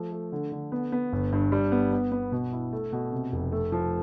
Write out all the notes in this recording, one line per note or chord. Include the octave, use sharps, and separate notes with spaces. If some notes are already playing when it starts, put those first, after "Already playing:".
Already playing: F3 A3
A3
D3
D3
B3
B3
G1
G2
G3
B3
B3
B3
B2
E4
A3
B2
C3
F1
A3
F3